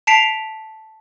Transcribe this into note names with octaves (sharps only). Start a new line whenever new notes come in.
A5 B6 C7 D7 F7